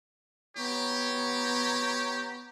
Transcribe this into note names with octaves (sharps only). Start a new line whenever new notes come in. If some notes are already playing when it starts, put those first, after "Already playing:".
B3 G4 C#5 A#5